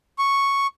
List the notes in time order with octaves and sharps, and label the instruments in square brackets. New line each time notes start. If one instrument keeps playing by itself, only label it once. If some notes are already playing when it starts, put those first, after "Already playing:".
[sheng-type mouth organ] C#6